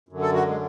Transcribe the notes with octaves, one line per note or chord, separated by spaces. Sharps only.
F#2 D3
A4
F#4
G#3